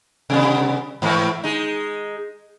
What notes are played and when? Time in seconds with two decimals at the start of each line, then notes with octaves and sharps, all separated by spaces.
0.30 C3 G3 B3
1.02 G#2 E3 A3
1.44 G#3 D#4